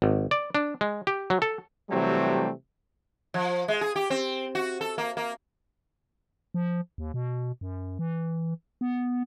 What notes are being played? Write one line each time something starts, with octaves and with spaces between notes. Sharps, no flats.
G#1
D5
D4
G#3
G4
F#3
A4
C3 E3 F#3 G3 A3 C4
F3
G#3
G#4
G4
C4
F#4
A4
A#3
A#3
F3
D#2
B2
F#2
E3
B3